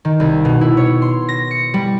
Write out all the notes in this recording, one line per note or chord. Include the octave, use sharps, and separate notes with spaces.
D#3
C2
B2
E4
C#5
C6
A#6
C#7
G3